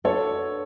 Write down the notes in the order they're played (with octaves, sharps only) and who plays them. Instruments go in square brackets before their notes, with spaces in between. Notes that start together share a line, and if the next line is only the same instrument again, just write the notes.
[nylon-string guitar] A3 D4 F#4 B4 [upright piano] A4 C#5